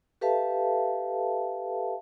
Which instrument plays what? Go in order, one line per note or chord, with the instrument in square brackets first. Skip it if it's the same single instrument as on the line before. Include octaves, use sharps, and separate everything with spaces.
[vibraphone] G4 A4 B4 E5 F5 A5